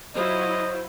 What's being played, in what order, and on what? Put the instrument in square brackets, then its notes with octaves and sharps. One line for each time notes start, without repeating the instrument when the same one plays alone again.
[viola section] F#3 E4 F4 [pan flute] C5 [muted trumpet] D#5